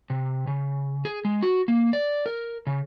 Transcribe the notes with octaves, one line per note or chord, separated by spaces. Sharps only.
C3
C#3
G#4
G#3
F#4
A#3
D5
A#4
C#3